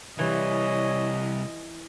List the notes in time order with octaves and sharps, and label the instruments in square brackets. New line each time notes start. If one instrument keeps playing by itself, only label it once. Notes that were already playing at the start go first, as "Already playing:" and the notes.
[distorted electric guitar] C3 G3 [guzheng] E3 [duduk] C#5 [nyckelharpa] D#5